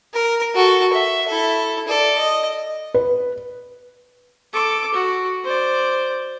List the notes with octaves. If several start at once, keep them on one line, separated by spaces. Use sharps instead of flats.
A#4
F#4 A4
E5
E4 A4
A4 D5
D#5
B4
A4 D6
F#4
C5 D5